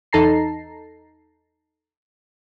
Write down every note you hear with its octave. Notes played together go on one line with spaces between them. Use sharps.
E2 D#4 A4 A5 A#5 C7